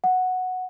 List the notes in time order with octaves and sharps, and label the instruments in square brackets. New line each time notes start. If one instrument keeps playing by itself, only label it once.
[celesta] F#5